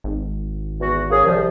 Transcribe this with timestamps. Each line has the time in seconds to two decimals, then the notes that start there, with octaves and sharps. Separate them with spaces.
0.04 G#1
0.80 E2 F#4
1.10 A#3 C#4 G#4
1.25 C2 F3